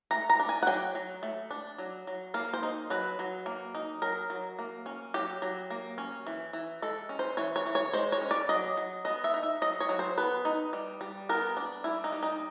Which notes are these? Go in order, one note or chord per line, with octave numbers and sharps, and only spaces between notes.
A3 A#5
A#5
D4
G#5
F#5
F#3 G5
F#3
A3
D4
F#3
F#3
A#3 F5
C5
D#4
F#3 B4
F#3
A#3
D#4
F#3 A#4
F#3
A#3
C#4
F#3 G4
F#3
A#3
C#4
E3
E3
G#3 A4
C#4
C5
E3 C#5
C#5
E3
C#5
G#3 C5
C#5
C#4
D5
F#3 D#5
F#3
B3 D#5
E5
D#4
E5
F#3 D#5
C#5
F#3
C5
B3 B4
D#4
G3
G3
B3 A#4
D4
G3 E4
D#4
G3
D#4